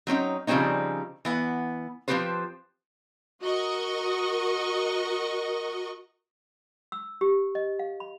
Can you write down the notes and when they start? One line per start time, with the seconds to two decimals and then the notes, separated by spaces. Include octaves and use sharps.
0.07 F#3 C4 C#4 D#4
0.47 C#3 F3 G3 C4 C#4 D#4
1.25 E3 B3 F#5
2.08 F3 G#3 C4 G4 B4 C5
3.42 F#4 A#4 D#5 C#6
6.92 E6
7.21 G4
7.55 D#5
7.79 F5
8.00 B5